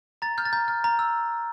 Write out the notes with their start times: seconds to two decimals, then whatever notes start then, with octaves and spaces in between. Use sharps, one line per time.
0.22 A#5 A6
0.38 F6 G6
0.45 A6
0.53 A#5 G6
0.68 F6
0.84 A#5
0.99 E6